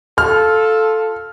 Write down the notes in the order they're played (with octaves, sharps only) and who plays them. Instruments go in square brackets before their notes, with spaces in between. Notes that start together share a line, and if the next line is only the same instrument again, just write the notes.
[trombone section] F4 A4 [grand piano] F6